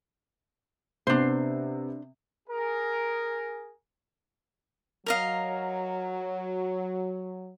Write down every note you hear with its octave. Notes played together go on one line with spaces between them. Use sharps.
C3 B3 D4 C5
G#4 A#4
F#3 A#4 D#5 F5